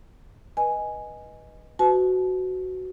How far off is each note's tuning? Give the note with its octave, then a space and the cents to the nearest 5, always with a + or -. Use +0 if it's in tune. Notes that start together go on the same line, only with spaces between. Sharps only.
B4 -20 D#5 +0 G#5 +0
F#4 +5 B4 +30 A5 -35